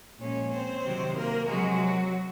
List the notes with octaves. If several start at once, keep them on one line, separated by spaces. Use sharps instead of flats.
A#2 F3 G#3 C#4 C#5
C4 C5
C3 D#3 F#3
A#3 A#4
C3 F3 F#3 G#3 F#4